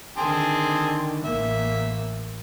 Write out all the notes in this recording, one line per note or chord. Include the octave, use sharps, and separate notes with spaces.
D3 D#3 C4 G#4 A5
A1 A#3 E5